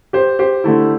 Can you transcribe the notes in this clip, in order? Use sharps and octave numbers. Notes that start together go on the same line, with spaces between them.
G4 C5
G4 C5
D3 A3 E4